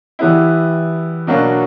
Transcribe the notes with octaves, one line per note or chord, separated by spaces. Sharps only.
E3 G3 B3 E4
B2 F#3 A#3 D4